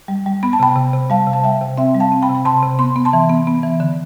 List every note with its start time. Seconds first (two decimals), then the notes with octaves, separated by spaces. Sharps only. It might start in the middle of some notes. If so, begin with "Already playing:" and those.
0.08 G3
0.26 G3
0.43 B3 B5
0.53 A5
0.60 C3 G5 B5
0.76 C3
0.94 C3
1.10 G3 F5 A5
1.27 C3
1.33 A5
1.43 G3 E5 G5
1.61 C3
1.78 C4 E5 G5
1.94 G3
2.00 F5 A5
2.12 C4
2.22 G5 B5
2.29 C3
2.35 B5
2.45 C3 A5 C6
2.63 C3
2.79 B3 C6
2.96 B3
3.05 A5 C6
3.13 E3
3.29 B3
3.47 B3
3.63 E3
3.80 D3